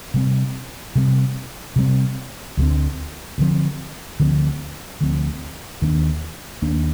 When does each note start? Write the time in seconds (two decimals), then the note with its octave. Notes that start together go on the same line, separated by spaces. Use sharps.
0.14 C3 G3 C4
0.95 C3 G3 C4
1.76 C3 G3 C4
2.57 D2 D3 F3 C4
3.38 D2 D3 F3 C4
4.20 D2 D3 F3 C4
5.01 D2 D3 F3 C4
5.81 D#2 D#3 A#3 D4
6.62 D#2 D#3 A#3 D4